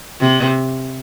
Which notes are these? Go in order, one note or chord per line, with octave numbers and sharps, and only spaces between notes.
C3